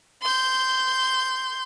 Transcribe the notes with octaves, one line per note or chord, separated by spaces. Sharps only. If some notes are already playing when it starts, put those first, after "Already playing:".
C6 G6